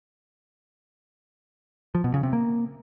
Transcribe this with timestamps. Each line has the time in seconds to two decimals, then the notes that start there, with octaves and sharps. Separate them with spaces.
1.95 F3
2.04 B2
2.14 C#3
2.23 C3
2.33 A#3